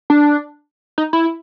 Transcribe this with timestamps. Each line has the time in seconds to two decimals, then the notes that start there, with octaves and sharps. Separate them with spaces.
0.10 D4
0.98 D#4
1.13 E4